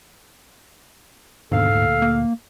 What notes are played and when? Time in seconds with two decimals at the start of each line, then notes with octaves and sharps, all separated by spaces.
1.52 D#2 G#2 B2 D3 A4 F5
1.74 D2 A#2
2.02 A#3